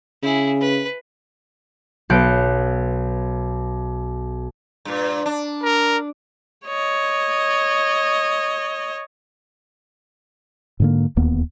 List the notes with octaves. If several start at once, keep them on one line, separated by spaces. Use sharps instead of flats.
C#3 E4 G#4
B4
B1 F5 F#6 G6 C#7 D7
G2 A#2
D4
A#4
C#5 D#5
G#2 D3 A#3
D1 D#2 A#3 B3